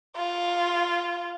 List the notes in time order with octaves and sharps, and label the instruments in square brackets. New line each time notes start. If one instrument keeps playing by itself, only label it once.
[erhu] F4